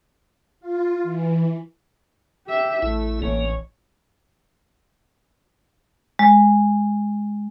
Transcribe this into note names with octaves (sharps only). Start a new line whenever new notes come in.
F4
E3
G4 E5
A1 A3 E4
A1 A#3 C#5
G#3